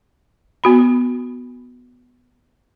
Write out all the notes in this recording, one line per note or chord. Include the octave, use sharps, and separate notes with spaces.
B3 F#4 B5